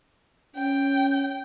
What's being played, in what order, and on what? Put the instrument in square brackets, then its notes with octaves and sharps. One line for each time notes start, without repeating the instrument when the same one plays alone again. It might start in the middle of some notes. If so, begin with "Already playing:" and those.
[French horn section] C#4 [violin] G5